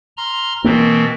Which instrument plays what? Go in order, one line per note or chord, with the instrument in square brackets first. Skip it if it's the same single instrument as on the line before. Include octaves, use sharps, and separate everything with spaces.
[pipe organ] A#5 C6 F6
[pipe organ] B2 E3 C4 [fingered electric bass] A#3